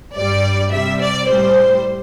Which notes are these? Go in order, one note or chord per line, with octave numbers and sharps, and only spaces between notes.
G2 G3 D5
C3 G3 E5
D5
A2 G3 C5